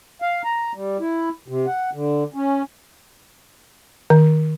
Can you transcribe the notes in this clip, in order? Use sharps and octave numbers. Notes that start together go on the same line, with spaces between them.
F5
A#5
G3
E4
C3
F#5
D3
C#4
D#3